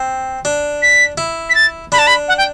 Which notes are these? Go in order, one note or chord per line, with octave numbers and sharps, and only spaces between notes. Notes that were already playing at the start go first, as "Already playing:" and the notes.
Already playing: C4
D4
B6
E4
B6
A6
D4 B5
A5
B5
F#5
G5